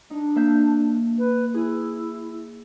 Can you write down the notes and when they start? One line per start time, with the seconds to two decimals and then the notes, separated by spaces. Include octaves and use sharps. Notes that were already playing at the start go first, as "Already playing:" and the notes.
0.10 D4 D#4
0.36 A#3 E5 G6
1.18 B4
1.54 E4 G#4